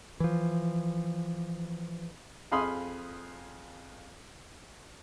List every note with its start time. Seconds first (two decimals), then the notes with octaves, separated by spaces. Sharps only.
0.20 E3 F3
2.52 F2 G#4 F5 B5 C6 D#6